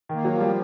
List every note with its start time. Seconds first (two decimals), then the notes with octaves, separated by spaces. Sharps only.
0.09 D#3 A#3
0.25 F#3
0.35 F3
0.40 G3